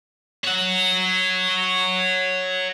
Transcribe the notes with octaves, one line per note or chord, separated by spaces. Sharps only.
C#5 F#5